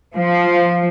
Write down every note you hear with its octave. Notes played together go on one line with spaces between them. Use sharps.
F3